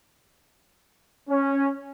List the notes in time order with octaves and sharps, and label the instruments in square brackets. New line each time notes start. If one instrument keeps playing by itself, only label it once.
[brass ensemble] C#4